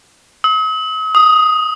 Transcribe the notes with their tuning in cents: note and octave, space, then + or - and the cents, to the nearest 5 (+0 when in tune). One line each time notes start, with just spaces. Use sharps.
D#6 +45
D#6 +5